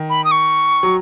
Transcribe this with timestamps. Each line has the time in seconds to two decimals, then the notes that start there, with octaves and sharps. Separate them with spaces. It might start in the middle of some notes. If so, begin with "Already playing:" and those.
Already playing: D#3
0.10 B5
0.24 D#6
0.31 C#6
0.83 F#3